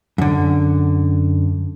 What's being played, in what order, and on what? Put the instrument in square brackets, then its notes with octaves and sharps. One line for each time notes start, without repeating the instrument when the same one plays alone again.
[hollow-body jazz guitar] F#2 D3